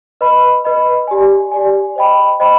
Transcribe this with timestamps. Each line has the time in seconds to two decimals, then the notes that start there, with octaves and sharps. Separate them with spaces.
0.21 B4 D#5 B5
0.64 B4 D#5 B5
1.07 G4 D5 G#5
1.52 G4 D5 G#5
1.96 C5 D#5 G5 B5
2.40 C5 D#5 G5 B5